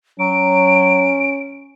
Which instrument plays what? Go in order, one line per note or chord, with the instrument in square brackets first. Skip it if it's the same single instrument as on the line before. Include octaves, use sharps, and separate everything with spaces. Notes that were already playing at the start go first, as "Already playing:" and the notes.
[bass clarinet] F#3 [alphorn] C#4 [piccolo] D7